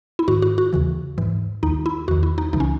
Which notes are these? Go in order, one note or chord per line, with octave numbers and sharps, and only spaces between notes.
E4
G#2 D#3 F#4
F#4
F#4
D#2 C#3 E3
G#2 E3
D#2 D#3 D#4
E4
E2 D#3 F#4
E4
D#4
C#2 C#3 E3 D#4
C#4